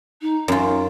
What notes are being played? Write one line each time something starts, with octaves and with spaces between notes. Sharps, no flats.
D#4
F#2 F4